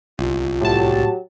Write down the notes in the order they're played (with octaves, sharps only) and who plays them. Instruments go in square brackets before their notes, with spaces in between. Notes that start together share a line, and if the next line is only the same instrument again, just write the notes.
[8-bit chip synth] C2 [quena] F4
[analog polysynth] A2 A5 [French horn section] F#3 F#4 G4